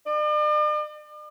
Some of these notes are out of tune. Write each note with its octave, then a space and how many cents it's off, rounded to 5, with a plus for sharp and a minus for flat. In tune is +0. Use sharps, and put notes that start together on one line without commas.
D5 +45